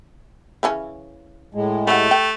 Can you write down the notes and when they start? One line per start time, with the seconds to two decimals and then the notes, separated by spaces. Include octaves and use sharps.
0.63 C#3 E3 C#4
1.55 A2 G#3
1.87 E3 G3 A3 F#5
2.11 G5